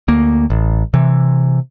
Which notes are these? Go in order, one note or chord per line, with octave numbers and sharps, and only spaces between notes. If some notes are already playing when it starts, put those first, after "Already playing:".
D2 A#3
A1
C3 E3